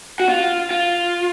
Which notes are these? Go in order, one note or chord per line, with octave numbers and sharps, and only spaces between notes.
F#4
F4
F4